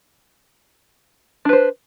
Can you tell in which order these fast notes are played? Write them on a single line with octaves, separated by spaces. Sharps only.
D4 B4 C5